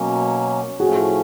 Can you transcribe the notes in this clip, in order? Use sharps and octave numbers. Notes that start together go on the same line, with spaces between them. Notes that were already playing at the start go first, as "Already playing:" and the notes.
Already playing: B2 F#3 A#3 C#4
A2 F3 A3 C#4 F#4 G#4